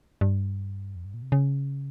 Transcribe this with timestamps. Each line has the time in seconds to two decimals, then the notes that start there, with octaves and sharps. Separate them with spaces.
0.21 G2
0.95 F2
1.05 G2
1.14 A#2
1.22 C3
1.32 C#3